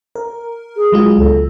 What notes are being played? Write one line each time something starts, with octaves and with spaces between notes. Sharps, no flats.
A#4
G#4
F#3 G#3 F4
C#2 B2 A4